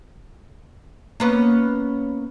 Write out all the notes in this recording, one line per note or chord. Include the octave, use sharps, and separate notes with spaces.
A#3 B3 C#4